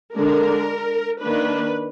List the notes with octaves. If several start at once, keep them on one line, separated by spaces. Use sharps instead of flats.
D3 G#3 D4 A#4
D#3 A#3 D4 B4